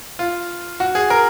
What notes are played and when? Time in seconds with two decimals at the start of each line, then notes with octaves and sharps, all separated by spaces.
0.19 F4
0.80 F#4
0.95 G#4
1.10 A#4